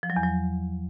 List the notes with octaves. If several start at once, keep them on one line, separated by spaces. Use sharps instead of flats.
F3
F#3
E2
F#3